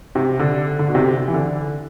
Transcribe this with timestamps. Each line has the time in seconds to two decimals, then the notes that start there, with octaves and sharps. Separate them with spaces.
0.15 C3
0.40 D3
0.79 D3
0.88 B2
0.95 C3
1.28 E3
1.34 D3